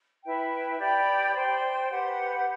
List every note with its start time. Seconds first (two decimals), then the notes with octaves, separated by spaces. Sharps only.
0.24 E4 B4 E5 G5
0.79 G4 D5 G5 B5
1.35 C5 G5 C6
1.90 G4 B4 F#5